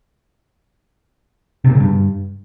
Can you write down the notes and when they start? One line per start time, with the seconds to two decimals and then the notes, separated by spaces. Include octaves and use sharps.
1.64 C3
1.70 A#2
1.75 C#3
1.80 G2